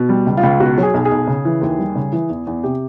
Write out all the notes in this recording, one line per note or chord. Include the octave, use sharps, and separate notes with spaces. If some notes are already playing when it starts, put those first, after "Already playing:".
Already playing: B2
G3
C#2
F4
C#2
B2 F#4
F#3
G#4
B1
G#4
B1
C#3
E3
D#2
G3
C#3
E3
E2
E2
C3 G4